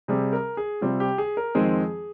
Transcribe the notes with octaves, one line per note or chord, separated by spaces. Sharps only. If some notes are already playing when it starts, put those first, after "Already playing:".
C3 G3 C4 G#4
A#4
G#4
C3 G3 C4 F4
G4
G#4
A#4
F2 D#3 G#3 C4 G#4